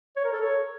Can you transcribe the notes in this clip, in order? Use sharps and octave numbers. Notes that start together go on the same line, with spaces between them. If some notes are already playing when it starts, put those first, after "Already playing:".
C#5
A#4
A4
C#5